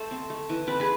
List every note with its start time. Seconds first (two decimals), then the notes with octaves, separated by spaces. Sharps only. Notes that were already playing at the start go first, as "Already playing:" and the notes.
Already playing: A3 A4 C5
0.11 C4
0.30 A3
0.49 E3
0.67 C4 B4 D5
0.80 G#4 B4